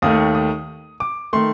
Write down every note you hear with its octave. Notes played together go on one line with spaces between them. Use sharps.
D#2 D#3 A3 D#6
D#6
D6
D#3 A3 C6